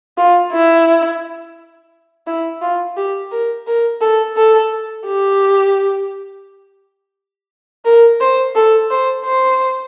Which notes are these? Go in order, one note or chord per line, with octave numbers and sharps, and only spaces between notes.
F4
E4
E4
F4
G4
A#4
A#4
A4
A4
G4
A#4
C5
A4
C5
C5